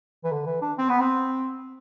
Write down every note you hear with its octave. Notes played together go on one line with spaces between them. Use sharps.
E3
D3
E3
D4
C4
B3
C4